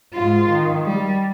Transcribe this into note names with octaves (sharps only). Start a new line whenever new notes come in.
G#2 F4
D#3
G3